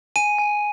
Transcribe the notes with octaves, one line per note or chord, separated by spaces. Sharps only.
G#5 D#7
G#5